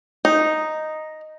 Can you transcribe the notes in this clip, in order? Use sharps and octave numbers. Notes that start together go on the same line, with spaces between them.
D#4